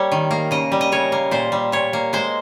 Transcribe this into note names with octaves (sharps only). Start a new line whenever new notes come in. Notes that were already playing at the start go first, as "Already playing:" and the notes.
Already playing: G3 A#3 C#5
D#3
A#3
C#3 D#5
G3
D#5
C#3 C#5
A#3
A#2 C5
G3
A#2 C#5
A#3
G#3 C5